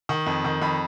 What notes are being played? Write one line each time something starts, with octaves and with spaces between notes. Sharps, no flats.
D#3
F2
D#3
F2 B5